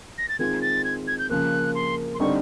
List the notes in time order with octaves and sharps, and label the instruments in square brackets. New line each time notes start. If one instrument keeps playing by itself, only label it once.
[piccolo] A#6
A6
[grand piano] D#3 G#3 C4 F4 [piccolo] G#6
[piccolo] A6
G#6
G#6
G6
[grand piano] C#3 F3 A#3 [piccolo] F#6
[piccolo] C6
C6
[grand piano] D3 G3 C4 D#4 [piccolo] C#6